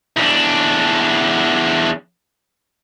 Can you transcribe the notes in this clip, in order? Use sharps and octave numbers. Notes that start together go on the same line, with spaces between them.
E2 D4